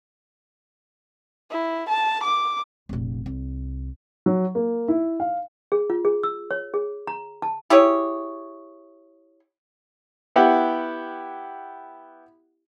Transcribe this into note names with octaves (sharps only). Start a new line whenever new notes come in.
E4
A5
D6
F1 A#1
C2
F#3
A#3
E4
F5
G#4
F4
G#4
E6
C#5
G#4
A#5
A5
E4 G4 G#4 C#5
B3 E4 G4 F#5